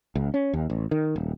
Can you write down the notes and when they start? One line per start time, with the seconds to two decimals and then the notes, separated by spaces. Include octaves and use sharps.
0.15 C#2
0.34 C#4
0.53 D#2
0.70 A1
0.91 D#3
1.16 D#1